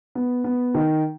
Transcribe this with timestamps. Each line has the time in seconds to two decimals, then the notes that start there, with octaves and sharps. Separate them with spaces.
0.15 B3
0.44 B3
0.74 D#3